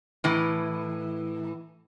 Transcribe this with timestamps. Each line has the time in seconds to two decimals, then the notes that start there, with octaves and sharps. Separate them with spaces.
0.24 A2 E3